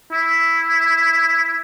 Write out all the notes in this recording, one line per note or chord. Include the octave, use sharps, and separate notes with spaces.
E4